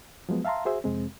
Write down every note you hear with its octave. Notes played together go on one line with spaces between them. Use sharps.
F3 F#3 G#3 B3
E5 F5 A5 A#5 C6
F#4 G#4 C5 E5
F2 C3 G#3 C4